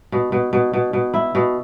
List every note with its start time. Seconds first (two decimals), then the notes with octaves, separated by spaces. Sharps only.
0.12 B2
0.32 B2
0.53 B2
0.74 B2
0.93 B2
1.14 E4
1.35 B2